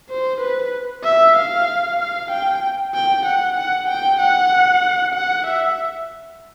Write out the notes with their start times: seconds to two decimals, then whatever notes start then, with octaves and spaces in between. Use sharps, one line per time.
0.09 C5
0.41 B4
1.04 E5
1.36 F5
1.99 F5
2.31 G5
2.94 G5
3.26 F#5
3.56 F#5
3.88 G5
4.20 F#5
5.14 F#5
5.47 E5